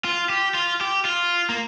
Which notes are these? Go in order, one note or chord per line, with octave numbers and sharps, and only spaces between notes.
F4
G4
F4
G4
F4
A#3